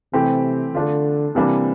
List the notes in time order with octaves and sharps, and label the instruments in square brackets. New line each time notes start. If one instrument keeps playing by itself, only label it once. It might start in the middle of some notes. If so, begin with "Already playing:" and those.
[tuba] C3 [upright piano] E3 A3 C4 G4
[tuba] D3 [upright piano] A3 D4 F4
[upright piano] C3 E3 G3 A#3 D4 [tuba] C4